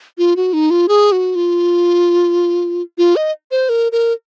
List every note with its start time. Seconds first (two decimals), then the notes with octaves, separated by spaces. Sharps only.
0.18 F4
0.37 F#4
0.53 D#4
0.70 F4
0.88 G#4
1.12 F#4
1.35 F4
2.98 F4
3.16 D#5
3.51 C5
3.69 A#4
3.92 A#4